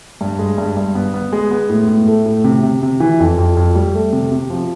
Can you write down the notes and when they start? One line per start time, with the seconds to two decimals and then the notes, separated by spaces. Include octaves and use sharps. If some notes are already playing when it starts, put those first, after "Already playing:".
0.21 G2
0.39 G#3
0.58 G2
0.77 G2
0.95 B3
1.14 B3
1.32 G#3
1.51 B3
1.70 A2
1.88 A2
2.08 A3
2.26 A2
2.44 C3
2.63 C3
2.83 C3
3.00 E3
3.20 F2
3.38 F2
3.57 F2
3.75 G3
3.95 A3
4.13 C3
4.32 C3
4.50 F3